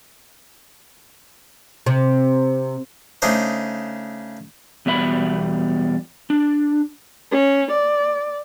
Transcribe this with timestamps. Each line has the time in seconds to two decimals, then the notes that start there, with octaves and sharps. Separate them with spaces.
1.86 C3
3.22 C#3 A3 D4 D#4 C5
4.86 E2 B2 G3 E5 B5
6.30 D4
7.31 C#4
7.71 D5